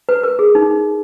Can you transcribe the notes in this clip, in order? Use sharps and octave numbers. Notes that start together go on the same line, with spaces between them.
B4
A#4
G#4
D#4